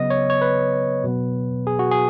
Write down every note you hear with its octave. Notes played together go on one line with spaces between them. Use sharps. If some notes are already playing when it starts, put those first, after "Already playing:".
Already playing: C#3 F#3 B3 D#5
C#5
C#5
B4
B2 F#3 B3
G#4
F#4
G#4